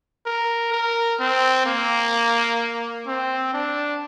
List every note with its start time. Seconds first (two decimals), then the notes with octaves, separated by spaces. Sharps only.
0.26 A#4
0.72 A#4
1.19 C4
1.66 A#3
3.07 C4
3.54 D4